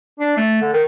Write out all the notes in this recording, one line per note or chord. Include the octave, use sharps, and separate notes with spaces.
D4
A3
D3
D#3